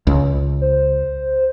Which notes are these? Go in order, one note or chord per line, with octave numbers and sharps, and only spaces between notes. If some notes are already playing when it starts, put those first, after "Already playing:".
C#2
C5